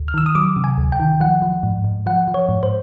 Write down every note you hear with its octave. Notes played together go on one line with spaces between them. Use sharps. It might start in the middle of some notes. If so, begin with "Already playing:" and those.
Already playing: D2
F6
D#3 E6
D#6
F#3 D6
C3
G#5
D2
G5
D#3
F3 F#5
F3
G#2
G#2
F3 F#5
F3
C#5
G#2
C5